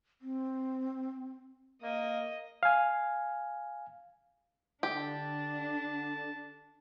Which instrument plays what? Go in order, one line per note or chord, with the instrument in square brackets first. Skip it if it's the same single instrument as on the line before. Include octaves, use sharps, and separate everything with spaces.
[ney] C4
[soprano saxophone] A#3 [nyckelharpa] D#5
[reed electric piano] F5 G#5
[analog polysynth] D3 [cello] D4 [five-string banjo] G4 [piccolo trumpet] A5